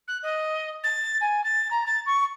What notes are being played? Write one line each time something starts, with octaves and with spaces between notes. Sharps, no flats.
F#6
D#5
A6
G#5
A6
A#5
A6
C#6